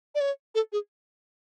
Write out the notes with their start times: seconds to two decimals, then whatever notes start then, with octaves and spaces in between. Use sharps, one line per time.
0.15 D5
0.21 C#5
0.55 A4
0.73 G#4